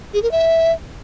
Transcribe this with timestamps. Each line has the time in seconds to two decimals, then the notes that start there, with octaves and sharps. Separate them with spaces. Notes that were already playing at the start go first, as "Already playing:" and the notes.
0.14 G#4
0.23 A#4
0.31 E5